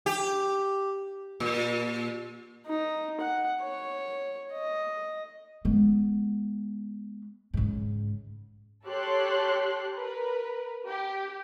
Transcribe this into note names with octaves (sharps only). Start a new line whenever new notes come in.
G4
A#2
D#4
F#5
C#5
D#5
G#3 B3
G#2 C#3
G4 A4 C#5 C6 F#6
A#4 B4
G4